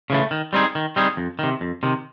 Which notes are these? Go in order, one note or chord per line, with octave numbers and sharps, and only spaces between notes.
C#3 E3 A3
D#3
G3 C4 D#4 G#4
D#3
G3 C4 D#4 G#4
F2
C3 D#3
F2
C3 D#3